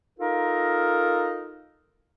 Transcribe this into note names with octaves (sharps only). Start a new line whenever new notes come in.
D#4 F4 A4 A#4